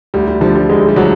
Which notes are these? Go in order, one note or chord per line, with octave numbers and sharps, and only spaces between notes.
D2 G3
G3
D3 F3 G3
G3
D2 G#3
G3
D3 F3 F#3